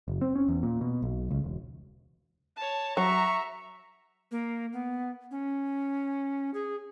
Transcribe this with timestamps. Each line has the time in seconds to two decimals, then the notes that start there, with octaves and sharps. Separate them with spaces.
0.08 F#1
0.21 C4
0.36 C#4
0.49 E2
0.63 A#2
0.81 B2
1.02 B1
1.31 C#2
1.44 E1
2.57 C#5 A5
2.97 F#3 E5 A#5 C#6
4.31 A#3
4.73 B3
5.31 C#4
6.54 G#4